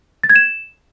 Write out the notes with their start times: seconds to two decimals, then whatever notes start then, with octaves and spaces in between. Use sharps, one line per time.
0.23 A6
0.30 G#6
0.36 E7